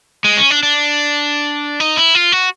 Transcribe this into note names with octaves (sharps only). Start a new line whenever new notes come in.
G#3
C#4
D4
D4
D#4
E4
F4
F#4